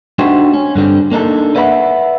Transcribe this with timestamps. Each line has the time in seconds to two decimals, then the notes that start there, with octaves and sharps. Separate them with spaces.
0.19 A3 D4 D#4 F#4 G4 C5
0.54 C#4
0.75 G2 D3 G3 C4
1.11 A#3 D4 D#4 A4
1.55 B4 D5 E5 F#5 A5 B5